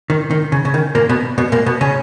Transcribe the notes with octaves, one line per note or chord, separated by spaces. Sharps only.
D#3
D#3
C#3
C#3
D#3
A#2 A#3
B2 B3
B2 B3
A#2 A#3
B2 B3
C#3 C#4